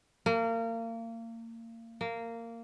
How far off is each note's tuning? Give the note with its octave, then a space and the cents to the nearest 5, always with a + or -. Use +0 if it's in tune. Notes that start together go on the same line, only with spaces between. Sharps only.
A#3 -30
A#3 -15